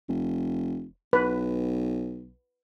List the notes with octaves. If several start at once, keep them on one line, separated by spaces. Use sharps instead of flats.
F1
B1 B4